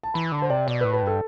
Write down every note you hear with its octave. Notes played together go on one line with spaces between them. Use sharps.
A5
E3 B5
D3 A5
C5
C3 D5
B2 D5
A2 B4
B4
G2 A4